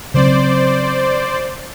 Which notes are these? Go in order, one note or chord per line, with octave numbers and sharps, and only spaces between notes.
C#3 F#3 C4 C5 D5